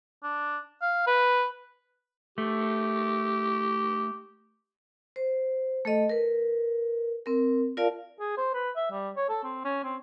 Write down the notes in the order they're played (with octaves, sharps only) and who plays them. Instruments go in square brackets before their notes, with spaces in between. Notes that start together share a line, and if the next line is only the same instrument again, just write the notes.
[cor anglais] D4
F5
B4
[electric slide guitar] A3 [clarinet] G4
[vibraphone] C5
A3 A4 D#5
A#4 B4
C4 A#4
F4 A#4 D5 F5 A5
[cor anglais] G#4
C5
B4
E5
G3
C#5
A4
C4
C#4
C4